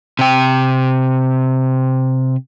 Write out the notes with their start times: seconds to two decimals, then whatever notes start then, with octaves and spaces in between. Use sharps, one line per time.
0.19 C3 G5